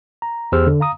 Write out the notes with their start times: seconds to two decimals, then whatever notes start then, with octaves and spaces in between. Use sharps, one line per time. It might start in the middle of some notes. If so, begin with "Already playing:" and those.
0.22 A#5
0.52 E2 G4 G#4 C5 E6 F6
0.67 D3
0.80 F5 A#5 D#6